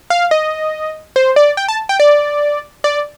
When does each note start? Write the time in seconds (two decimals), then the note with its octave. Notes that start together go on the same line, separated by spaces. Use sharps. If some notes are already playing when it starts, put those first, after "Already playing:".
0.10 F5
0.31 D#5
1.16 C5
1.36 D5
1.57 G5
1.68 A5
1.89 G5
2.00 D5
2.84 D5